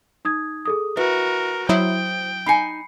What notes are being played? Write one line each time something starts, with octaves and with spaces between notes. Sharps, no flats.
D#4 D#6 G#6
G#4 A4 D#6
E4 F#4 A#4 B4
F#3 E4 C5 G5 D#6
D#4 G#5 B5 C7 C#7